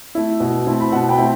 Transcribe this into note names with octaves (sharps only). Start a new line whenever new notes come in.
A3 E4
B2
A3 C4 E4
B5
B2 F#5 A5
G5 B5
A3 C4 E4